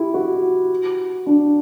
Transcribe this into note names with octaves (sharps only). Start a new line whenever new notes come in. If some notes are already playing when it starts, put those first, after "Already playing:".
Already playing: E4 G4
F#4
D4